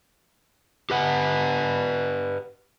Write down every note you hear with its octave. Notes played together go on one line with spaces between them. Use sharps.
G4 B4 F#5